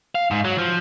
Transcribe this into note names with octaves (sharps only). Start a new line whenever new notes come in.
F5
G#2
F#3
F3